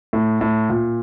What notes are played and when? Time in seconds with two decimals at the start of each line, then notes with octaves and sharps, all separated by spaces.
0.13 A2
0.41 A2
0.70 A#2